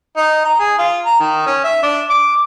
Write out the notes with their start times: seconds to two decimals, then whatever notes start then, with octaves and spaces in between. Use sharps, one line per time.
0.17 D#4
0.45 A#5
0.59 G#4
0.78 F4
1.05 A#5
1.20 D#3
1.46 C#4
1.64 E5
1.83 D4
2.10 D6